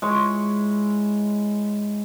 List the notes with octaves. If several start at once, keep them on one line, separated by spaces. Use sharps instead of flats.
G#3 E4 C#5